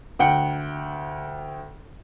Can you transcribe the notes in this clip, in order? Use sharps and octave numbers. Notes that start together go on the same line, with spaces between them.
D2 F#5 G5 C#7